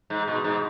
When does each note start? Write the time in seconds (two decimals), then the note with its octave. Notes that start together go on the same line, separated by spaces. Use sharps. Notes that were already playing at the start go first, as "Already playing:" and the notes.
0.10 G#2
0.27 B2
0.44 G#2